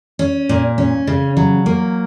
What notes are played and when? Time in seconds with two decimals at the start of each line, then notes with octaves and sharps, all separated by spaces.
0.19 C#4
0.49 A#2
0.78 C#4
1.07 C#3
1.37 F#3
1.66 A#3